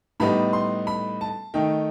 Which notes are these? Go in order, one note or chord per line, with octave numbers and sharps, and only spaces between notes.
A2 G3 B3 D#4 B5
C6
B5
A5
D#3 A3 D#4 G5